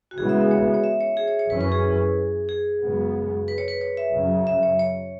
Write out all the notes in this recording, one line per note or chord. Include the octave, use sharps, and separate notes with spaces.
F#4
C#3 E3 G#3 B3 G#4
E5
E5
C#5
C#5
E5
C#5
G#4
C#5
C#5
F#2 E3 C#4 B4
B4
G#4
G#4
F#2 C#3 G#3 B3
B4
C#5
B4
C#5
E5
F#2 C#3 F#3
E5
C#5
C#5